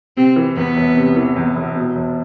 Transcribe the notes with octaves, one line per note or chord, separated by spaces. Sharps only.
C3 C4
E3
E2 B3
E1
C3
E3
E2
E1
B2
E1